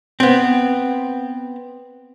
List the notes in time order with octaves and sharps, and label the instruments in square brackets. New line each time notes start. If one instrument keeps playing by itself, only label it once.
[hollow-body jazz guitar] B3 C4